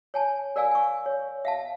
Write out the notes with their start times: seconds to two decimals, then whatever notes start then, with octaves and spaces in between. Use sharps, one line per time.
0.14 C#5 G#5 A5
0.56 A#4 D5 F5 G#5 E6
0.71 G#5 C#6
1.06 C#5
1.45 E5 F5 A5